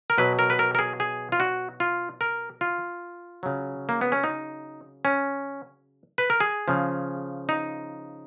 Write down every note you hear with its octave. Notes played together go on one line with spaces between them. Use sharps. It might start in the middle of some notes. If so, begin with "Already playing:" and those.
A#4
B2 F#3 B4
A#4
B4
A#4
A#4
G#4
G#4
F4
F#4
F4
A#4
F4
C#3 F#3
A#3
B3
C#4
D#4
C#4
B4
A#4
G#4
C#3 F3
D#4